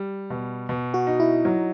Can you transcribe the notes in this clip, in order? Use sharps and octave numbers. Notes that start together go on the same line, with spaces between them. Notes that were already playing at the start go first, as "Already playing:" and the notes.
Already playing: G3
B2
B2
F#4
D#4
E4
F#3